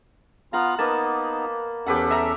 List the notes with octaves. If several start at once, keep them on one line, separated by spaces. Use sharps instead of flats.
B3 F4 F5 F#5 A#5
A#3 B3 D#4 B4 A5
E2 C#4 G4 A4 B4 F#5
E5 A#5